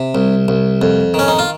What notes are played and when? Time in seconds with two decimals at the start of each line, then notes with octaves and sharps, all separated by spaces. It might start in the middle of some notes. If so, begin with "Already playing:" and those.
Already playing: C3
0.15 C2
0.48 C2
0.82 F2
1.14 D#3 C#4
1.28 D#4
1.39 F4